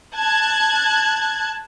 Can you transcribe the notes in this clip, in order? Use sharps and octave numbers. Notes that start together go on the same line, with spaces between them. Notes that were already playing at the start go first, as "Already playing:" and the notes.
A5 F#6 G#6